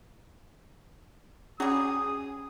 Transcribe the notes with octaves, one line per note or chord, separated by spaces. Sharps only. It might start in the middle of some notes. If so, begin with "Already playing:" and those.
F#3 G3 C#4 G#4 D#6